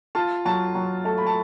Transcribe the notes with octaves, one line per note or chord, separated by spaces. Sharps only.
F4 A5
F#3 A5
F#3
A3 A5
B5
A5